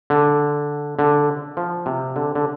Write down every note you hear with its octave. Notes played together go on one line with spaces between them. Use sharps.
D3
D3
F3
C3
D3
D3